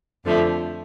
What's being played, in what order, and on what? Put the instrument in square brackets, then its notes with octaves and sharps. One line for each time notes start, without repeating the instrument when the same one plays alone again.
[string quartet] F2 D3 F3 A3